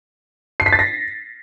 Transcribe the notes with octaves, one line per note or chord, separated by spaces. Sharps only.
C7
B6
A6
A#6